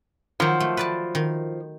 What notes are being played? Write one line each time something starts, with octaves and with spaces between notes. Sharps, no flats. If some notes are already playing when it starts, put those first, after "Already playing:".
D#3 F3 F#3
A3
B4 D5 A5
D#3